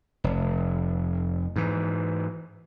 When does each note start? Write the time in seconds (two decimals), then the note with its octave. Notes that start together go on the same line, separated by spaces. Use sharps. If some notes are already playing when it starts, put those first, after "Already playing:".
0.24 F1
1.56 G#2 E3